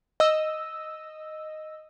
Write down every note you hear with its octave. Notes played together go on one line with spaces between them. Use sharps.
D#5 E6